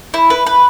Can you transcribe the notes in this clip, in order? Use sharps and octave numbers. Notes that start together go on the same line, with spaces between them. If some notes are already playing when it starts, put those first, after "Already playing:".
E4
B4
B4